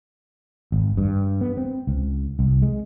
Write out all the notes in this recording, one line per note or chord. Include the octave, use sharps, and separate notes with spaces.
G#1
G2
B3
C4
C#2
C2
G#3